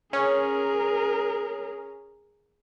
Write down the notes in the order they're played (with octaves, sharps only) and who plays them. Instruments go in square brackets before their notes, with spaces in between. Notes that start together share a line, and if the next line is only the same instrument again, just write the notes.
[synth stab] C#4 [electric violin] G#4 A#4